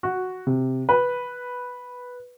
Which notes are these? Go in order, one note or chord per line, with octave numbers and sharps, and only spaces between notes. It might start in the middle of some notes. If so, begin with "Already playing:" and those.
F#4
C3
B4